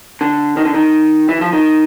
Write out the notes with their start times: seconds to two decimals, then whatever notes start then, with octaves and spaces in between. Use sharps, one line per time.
0.21 D3
0.57 D#3
0.65 D3
0.74 D#3
1.29 E3
1.41 F3
1.53 D#3